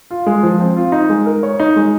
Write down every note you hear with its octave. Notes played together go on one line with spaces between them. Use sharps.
F4
G#3
F3
C4
F4
D#4
G#3
A#4
C#5
D#4
G#3